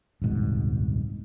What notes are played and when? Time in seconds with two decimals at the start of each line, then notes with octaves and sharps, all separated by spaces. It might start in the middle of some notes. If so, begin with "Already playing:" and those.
0.22 D#1 C2 G#2 B2